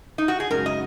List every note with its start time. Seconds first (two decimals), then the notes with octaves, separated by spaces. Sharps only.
0.18 D#4
0.28 F#4
0.40 G#4
0.50 F#2 C#3 G#3 D#4 F#4 A#4
0.66 D#5